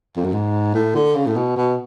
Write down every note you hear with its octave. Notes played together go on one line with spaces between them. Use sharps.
F2
F#2
G#2
A2
D3
C#3
A2
B2
B2